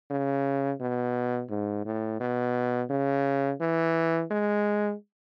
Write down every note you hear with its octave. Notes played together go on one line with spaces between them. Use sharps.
C#3
B2
G#2
A2
B2
C#3
E3
G#3